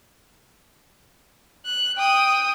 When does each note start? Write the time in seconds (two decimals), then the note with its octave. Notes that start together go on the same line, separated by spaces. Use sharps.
1.66 F#6
1.98 G5 D#6